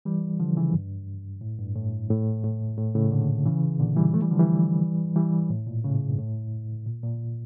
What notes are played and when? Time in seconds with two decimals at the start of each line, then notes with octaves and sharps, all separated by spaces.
0.05 E3 G3
0.40 D3 F3
0.56 C#3 E3
0.73 G2
1.41 A2
1.59 G2
1.75 A2
2.10 A2
2.44 A2
2.77 A2
2.95 A2 C#3
3.12 A#2 D3
3.46 C#3 E3
3.80 A#2 D3
3.97 E3 G3
4.14 F3 A3
4.22 E3 G3
4.30 D3 F3
4.39 E3 G3
5.16 E3 G3
5.50 A2
5.67 A#2
5.84 A2 C#3
6.09 G2
6.18 A2
6.86 A#2
7.03 A#2